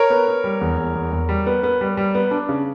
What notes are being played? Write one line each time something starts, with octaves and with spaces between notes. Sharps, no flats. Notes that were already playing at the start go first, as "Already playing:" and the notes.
Already playing: A#4 C#5
B3
B3
G3
E2
E2
E2
E2
G3
B3
B3
G3
G3
B3
D4
C#3